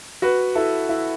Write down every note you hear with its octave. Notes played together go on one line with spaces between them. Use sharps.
F#4 B4
E4 A4
E4